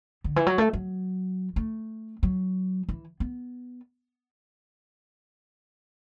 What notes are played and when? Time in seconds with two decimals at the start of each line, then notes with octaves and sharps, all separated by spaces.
0.24 D3
0.36 E3
0.46 F#3
0.58 A3
0.73 F#3
1.56 A3
2.23 F#3
2.89 E3
3.20 B3